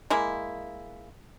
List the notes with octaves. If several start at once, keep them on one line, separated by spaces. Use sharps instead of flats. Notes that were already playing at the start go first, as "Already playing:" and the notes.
G#3 A#3 E4